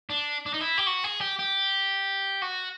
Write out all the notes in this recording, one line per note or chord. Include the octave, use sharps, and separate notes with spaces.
D4
D4
D#4
E4
G4
F#4
G#4
G4
G4
F#4